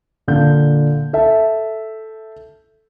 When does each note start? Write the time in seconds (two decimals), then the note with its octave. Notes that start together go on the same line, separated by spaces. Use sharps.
0.28 A#2 D3 F5 G6
1.13 A4 E5 A5